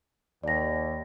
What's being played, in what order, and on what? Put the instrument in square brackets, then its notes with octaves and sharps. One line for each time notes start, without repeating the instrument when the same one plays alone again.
[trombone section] D#2 [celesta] D5 A#6